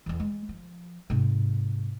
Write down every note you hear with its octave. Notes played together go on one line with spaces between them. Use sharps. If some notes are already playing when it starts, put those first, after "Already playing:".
E2 E3
G#3
F3
G#2 C3